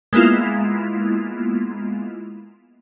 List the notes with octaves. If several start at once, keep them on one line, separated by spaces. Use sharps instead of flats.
G#3 A#3 B3 E4 F4